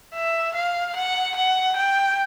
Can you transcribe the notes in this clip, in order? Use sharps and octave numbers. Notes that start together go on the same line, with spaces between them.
E5
F5
F#5
F#5
G5